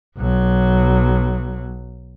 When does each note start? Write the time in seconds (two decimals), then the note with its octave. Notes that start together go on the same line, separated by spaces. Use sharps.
0.17 B1 F#3